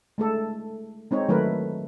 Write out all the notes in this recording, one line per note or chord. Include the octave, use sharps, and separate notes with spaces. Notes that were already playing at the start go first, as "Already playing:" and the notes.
G#3 A3 A4
G#3 C4 D#4 C#5
D#3 F#3 A3 A#4 B4